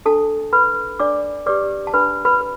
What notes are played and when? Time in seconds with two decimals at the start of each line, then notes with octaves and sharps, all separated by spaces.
0.06 D4 A4 A5
0.53 B4 B5
0.99 D4 D5 D6
1.46 G4 B4 D5 D6
1.87 A5
1.94 D4 B4 B5
2.25 B4 B5
2.41 B4